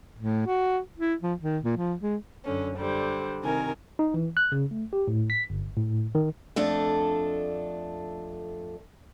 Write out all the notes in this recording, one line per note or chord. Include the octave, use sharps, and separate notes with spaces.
A2
F#4
E4
F3
D#3
A#2
F3
G#3
F#2 D3 C#4
D3 G3 C5
C3 D#3 A#4 G#5
D#4
E3
F#6
C#3
A3
G4
A2
B6
G1
A2
D#3
F2 A3 D4 A4